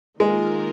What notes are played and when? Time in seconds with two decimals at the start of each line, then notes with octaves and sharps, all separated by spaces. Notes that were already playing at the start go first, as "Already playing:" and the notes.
0.20 D#3 G#3 A#3 F4 A#4